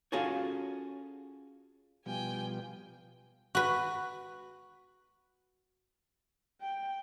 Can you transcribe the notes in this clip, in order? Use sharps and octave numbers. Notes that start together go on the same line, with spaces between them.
C#4 F4 F#4 G#4 A4 C#5
B2 F3 G3 G5 G#5
F#4 B4
G5